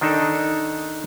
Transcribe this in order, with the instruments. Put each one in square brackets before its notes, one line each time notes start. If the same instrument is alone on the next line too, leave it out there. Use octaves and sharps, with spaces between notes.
[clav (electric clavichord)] D#3 D4 D#4 A4